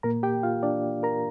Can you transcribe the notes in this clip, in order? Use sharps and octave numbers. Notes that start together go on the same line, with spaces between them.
A#2 A#3 A#4 A#5
G4 G5
F4 F5
D4 D5
A#4 A#5